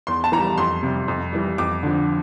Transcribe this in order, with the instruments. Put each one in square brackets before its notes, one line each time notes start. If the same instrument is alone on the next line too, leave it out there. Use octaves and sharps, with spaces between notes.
[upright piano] E2 C6
A5
E3 G3 A#5
F2 C6
C3 G3
F2
E3 G3
F2 D6
D3 F3